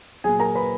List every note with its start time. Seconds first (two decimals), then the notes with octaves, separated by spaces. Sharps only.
0.24 A#2 F#3 G#4 G#5
0.40 A#4 A#5
0.55 B4 B5